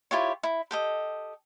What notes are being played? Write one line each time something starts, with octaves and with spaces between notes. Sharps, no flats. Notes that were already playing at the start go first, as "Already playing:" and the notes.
E4 F4 G4 C#5
E4
G4 A4 D#5